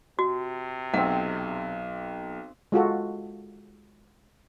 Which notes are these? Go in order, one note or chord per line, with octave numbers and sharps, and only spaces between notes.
C3 F#4
B1 C4 D#5 F#5
G#3 F4 F#4 A4